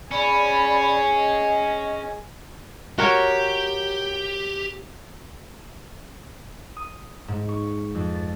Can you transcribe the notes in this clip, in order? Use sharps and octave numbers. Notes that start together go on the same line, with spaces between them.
C#4 G#4 D5 B5
D#5
F#4 G4 A#4 C#5
D#6
G#2
C#6
F2
A6